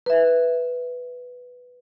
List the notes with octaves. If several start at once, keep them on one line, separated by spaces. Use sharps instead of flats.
B4 E5